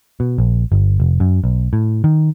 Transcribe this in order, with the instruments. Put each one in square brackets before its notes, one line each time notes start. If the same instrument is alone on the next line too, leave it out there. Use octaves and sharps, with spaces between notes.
[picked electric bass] B2
A#1
G1
F1
F#2
B1
A2
D#3